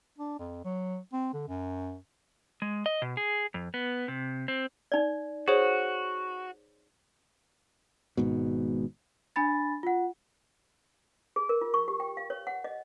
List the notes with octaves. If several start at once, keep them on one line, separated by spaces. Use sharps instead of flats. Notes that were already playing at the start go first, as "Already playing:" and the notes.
D4
F2
F#3
C4
D3
F#2
G#3
D#5
B2
G#4
F2
B3
C3
C4
D#4 D5
F#4 G#4 C5 C#5
G#1 G#2 B2
D4 G#5 B5 A6
F4 F#5
G#4
A#4
F4
C#6
G4
G5
F5
C#5
F#5
D#5